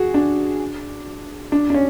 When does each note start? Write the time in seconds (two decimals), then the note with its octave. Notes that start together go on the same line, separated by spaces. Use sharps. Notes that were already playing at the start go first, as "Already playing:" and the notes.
Already playing: F#4 G#4
0.14 D4
1.52 D4
1.70 D4
1.74 C#4